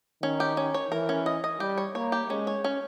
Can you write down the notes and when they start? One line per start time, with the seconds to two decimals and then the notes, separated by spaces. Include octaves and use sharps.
0.23 D#3 C#4
0.40 G4
0.57 C#4
0.74 C#5
0.91 E3 A#4
1.09 C#4
1.26 D#5
1.44 D#5
1.60 G3 G4
1.78 C#5
1.95 A#3 C#5
2.12 G4
2.29 G#3 C#4
2.47 C#5
2.64 C#4